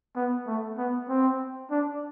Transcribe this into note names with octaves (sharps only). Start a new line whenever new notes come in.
B3
A3
B3
C4
D4